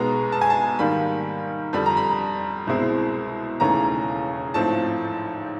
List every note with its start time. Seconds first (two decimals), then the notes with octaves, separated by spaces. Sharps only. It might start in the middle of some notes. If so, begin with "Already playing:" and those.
Already playing: B1 B2 G#3 B3 A#5
0.32 A5
0.41 G#5
0.50 A5
0.79 G#2 D#3 G3 A#3 B5
1.73 F2 D3 G3 B5
1.86 A#5
1.97 B5
2.67 C2 B2 G#3 C4 E4
3.60 E1 D#2 C#3 E3 A3 A#5
4.54 A1 G#2 F3 A3 C4 A5